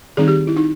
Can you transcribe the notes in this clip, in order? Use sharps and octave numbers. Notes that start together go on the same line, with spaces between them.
D#3 G3 C4 D#4 G#4
G4
E4
D#4